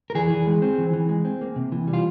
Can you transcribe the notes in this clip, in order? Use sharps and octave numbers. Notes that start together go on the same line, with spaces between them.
A#4
E3 G#4
E3
G#3
C4
E3
E3
G#3
C4
A#3
C3
E3
G3
F4